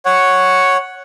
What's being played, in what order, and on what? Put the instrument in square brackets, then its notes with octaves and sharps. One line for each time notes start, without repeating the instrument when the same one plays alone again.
[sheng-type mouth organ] C#5 F#5